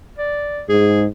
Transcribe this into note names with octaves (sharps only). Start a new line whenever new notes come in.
D5
G#2 G#4